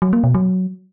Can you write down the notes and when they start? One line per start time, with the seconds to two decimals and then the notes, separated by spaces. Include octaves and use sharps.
0.02 F#3
0.13 A#3
0.24 B2
0.35 F#3